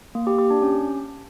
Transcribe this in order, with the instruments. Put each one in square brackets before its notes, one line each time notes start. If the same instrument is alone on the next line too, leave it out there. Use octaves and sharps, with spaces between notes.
[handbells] A#3
G4
G4
D4
C#4